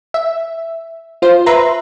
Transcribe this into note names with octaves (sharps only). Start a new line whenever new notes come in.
E5
F4 C5
B4 E5 A#5 C6